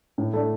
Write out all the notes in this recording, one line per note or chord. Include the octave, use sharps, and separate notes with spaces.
A2
A3 D4